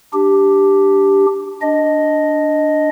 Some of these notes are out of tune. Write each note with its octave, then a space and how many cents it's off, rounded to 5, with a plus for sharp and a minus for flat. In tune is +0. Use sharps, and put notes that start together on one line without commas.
D4 +0 G4 +0
D4 +0 D#5 +0